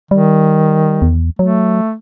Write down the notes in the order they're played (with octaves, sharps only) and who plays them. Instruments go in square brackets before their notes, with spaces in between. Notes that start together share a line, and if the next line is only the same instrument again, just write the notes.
[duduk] D#3 [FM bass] G3
[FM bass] E2
[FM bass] F#3 [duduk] A3